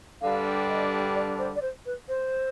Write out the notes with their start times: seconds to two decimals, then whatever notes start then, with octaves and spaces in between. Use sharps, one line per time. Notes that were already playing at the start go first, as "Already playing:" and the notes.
0.21 G2 D3 G3 D4 F5
0.68 D#5
1.14 D5
1.38 C5
1.55 D5
1.61 C5
1.85 B4
2.08 C5